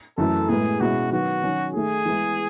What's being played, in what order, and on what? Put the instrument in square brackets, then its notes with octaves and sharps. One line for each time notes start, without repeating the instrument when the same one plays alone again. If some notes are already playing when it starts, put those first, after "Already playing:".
[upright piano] F#2 E3 A3 [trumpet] A4
[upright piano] A2 G#3 B3 E4 [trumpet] G#4
[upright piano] B2 G#3 C#4 E4 [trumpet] F#4
[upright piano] D#3 F#3 B3 [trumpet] F#4
[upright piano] D#3 F#3 C#4
[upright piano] D#3 A3 D#4 [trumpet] G#4
[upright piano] E3 G#3 B3 E4